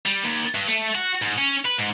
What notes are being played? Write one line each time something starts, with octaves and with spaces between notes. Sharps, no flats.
G3
D#2
G2
A3
F#4
G#2
C#4
B4
G#2